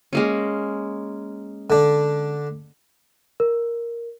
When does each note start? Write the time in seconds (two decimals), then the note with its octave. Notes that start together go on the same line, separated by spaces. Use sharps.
0.13 G#3 A#3 C#4
1.70 D3 D4
3.40 A#4